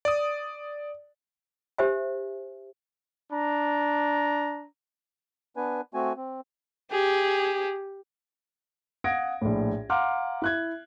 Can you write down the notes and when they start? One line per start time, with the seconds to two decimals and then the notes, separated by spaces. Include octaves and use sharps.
0.05 D5 D#6
1.78 G4 C5 E5 G#5
3.33 D4 A#5
5.56 B3 D4 B4 G#5
5.94 A3 C4 F#4 G#5
6.17 C4
6.92 G4 G#4
9.04 F5 F#5 D#6 G#6 A#6 D7
9.41 A#1 A2
9.89 F5 F#5 A#5 C6 D6 F6
10.42 E4 F#6 G#6